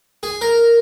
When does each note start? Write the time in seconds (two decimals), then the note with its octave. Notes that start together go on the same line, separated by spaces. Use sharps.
0.23 G#4
0.41 A#4